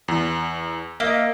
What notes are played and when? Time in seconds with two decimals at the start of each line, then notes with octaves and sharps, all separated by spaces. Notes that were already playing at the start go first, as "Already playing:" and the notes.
0.08 E2
1.00 A#3 D#5 E5